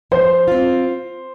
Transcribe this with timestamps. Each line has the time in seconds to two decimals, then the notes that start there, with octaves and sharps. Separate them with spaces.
0.11 F3 C5
0.48 C4 F4